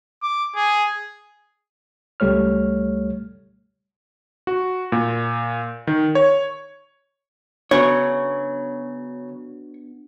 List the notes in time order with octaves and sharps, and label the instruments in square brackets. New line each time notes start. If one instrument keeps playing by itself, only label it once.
[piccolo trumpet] D6
G#4
[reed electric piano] C#2 G3 A3 C#5 F6
[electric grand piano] F#4
A#2
D#3
C#5
[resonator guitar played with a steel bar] C#3 F#3 [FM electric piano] B3 D4 F#4 [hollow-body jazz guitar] C#5